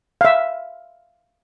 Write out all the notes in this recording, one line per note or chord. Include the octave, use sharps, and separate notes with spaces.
E5 F5